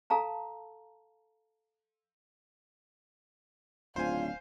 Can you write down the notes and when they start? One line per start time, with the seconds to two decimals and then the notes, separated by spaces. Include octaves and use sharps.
0.10 A4 F5 A5 A#5
3.96 D1 C#3 D4 F4 C5 F5 G#5